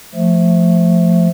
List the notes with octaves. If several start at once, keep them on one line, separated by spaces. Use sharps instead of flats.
F3 A3